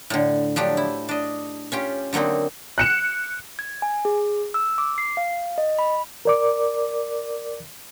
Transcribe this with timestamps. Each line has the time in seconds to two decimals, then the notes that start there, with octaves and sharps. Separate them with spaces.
0.10 A2 D3
0.56 F3 F#3 D4 G4
0.77 E4
1.09 D4 D#5
1.72 C#4 F4 G4
2.13 D3 F#3 A#3 C4 D#4
2.78 F#6 C#7 E7
3.59 G#6
3.82 G#5
4.05 G#4
4.54 E6
4.78 D6
4.98 C7
5.17 F5
5.58 D#5
5.79 B5
6.25 A#4 D5 D6